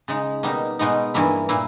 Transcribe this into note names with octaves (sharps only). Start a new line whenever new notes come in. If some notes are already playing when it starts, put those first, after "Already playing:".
C#3 G#3 D#4
B2 G3 A#3 D#4
B2 G#3 B3 D#4
G2 E3 A#3 E4
A#2 A#3 E4